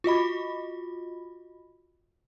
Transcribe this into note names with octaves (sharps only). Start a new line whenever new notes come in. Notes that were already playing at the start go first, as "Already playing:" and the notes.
F4 F#4 D#5 B5